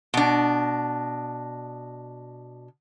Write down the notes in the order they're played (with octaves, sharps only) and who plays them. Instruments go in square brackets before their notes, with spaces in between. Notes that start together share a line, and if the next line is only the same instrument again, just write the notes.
[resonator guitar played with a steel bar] B2 D4